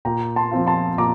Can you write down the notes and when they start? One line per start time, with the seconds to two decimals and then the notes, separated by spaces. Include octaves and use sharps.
0.05 A#2 G5 A#5
0.36 A5 C6
0.51 F3 C4 F4
0.67 A5 C6
0.98 A#2 A#5 D6